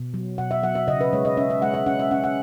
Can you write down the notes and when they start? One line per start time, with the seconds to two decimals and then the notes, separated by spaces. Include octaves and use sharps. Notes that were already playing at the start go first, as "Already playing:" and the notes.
Already playing: B2
0.14 F#3
0.38 B2 F#5
0.51 E5
0.63 F#3 F#5
0.75 E5
0.88 C#3 D#5
1.01 B4
1.13 G#3 C#5
1.25 D#5
1.37 C#4 E5
1.50 E5
1.62 G#3 F#5
1.74 E5
1.86 C#4 F#5
1.99 E5
2.11 C#4 F#5
2.24 F#5